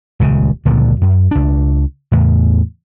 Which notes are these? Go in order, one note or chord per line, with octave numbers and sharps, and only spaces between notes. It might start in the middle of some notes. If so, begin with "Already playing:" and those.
D#1 C#2 C#3
C#2 A#2 D3 F3
F#2
C#2 D4
E2 A2 C#3